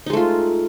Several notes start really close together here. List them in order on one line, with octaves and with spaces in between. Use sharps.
D#4 G#3 A3 F4